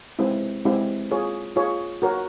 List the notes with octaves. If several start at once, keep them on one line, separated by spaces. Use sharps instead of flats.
G#3 C4 E4 G4
G#3 C4 E4 G4
F4 G#4 C#5
F4 G#4 C#5
F#4 A#4 C#5